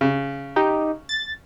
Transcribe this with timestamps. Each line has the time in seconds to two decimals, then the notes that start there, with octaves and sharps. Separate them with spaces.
0.01 C#3
0.56 D#4 G4
1.09 A6